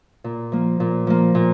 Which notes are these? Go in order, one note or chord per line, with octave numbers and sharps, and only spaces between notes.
A#2
F3 A#3
A#2
F3 A#3
A#2